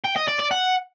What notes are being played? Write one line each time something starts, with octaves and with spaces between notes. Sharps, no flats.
G5
D#5
D5
D5
F#5